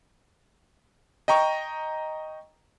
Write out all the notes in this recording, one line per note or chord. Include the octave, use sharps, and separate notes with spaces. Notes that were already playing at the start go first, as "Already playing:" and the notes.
D#5 G5 A#5 C#6